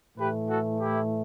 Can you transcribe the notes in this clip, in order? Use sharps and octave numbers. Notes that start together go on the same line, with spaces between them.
A2 E3 A3 G4 B4
F#4 A4
E4 G4